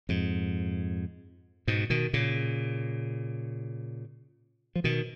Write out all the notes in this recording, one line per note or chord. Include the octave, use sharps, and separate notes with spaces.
F2 G#2
G#2 B2
B2 D#3
A#2 C#3
F3
B2 D#3